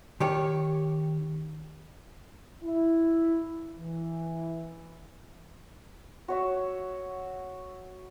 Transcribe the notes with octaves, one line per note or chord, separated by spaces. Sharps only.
D#3 G4 C#5
E4
E3
F#4 C#5 E5